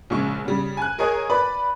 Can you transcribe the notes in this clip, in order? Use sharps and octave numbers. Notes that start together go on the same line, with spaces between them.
A#1 C#3 G#3 C#6
C#3 G3
G#5 F#6
G#4 A#4 C#5 D#5 G#5
B4 D5 B5